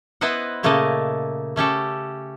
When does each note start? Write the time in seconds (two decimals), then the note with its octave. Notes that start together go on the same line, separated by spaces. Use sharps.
0.21 B3 E4 B4 C5 D#5 F#5
0.63 A#2 C#3 A3 A#3 A4 D#5
1.56 A3 C#4 G4 A4